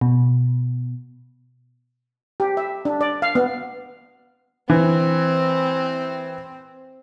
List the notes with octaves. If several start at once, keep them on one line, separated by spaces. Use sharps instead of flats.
B2
G4
E5
D4
D5
F5
B3
E3 C4